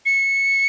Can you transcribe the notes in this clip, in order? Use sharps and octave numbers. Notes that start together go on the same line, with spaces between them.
C#7